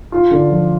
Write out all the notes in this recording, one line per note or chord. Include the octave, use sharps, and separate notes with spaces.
F4
D3
F3